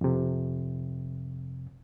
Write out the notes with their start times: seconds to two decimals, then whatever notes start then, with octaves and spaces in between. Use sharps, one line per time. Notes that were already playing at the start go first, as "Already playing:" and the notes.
0.01 F2 C3